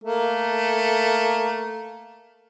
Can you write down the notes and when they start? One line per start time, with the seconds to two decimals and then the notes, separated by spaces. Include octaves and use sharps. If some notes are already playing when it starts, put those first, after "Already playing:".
0.04 A3 A#3